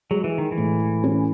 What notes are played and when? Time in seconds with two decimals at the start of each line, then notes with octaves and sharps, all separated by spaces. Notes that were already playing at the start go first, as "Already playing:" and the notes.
0.11 F#3 G#3
0.24 E3
0.38 D#3
0.52 E3
0.58 A2
1.04 C#4